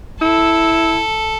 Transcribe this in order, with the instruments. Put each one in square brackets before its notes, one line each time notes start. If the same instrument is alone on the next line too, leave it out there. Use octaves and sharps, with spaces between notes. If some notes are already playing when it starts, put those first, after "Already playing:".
[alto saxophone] E4 [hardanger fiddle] A4